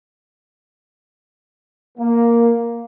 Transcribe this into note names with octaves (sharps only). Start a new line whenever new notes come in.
A#3